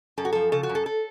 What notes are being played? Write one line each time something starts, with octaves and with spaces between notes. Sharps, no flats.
F#2 A4
F#4
F3 A4
C#3 A4
F#4
F#2
A4
A4